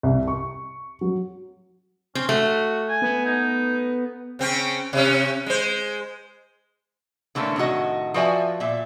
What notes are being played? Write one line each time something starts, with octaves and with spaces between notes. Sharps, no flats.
C2
C#6
F#3
C4 C#4
A3 F#4
G#5
B3
D#4
C#3 C4 C#4
C3 C#4
G#3 C5
D3 E3 A3 A#3 C#4
A2 C3 D#3 F#4 D#5
F3 F#4 B4 D5 E5 G#5
A#2 E5